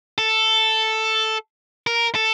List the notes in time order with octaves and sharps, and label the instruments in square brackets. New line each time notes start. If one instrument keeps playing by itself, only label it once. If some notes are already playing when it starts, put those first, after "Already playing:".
[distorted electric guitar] A4
A#4
A4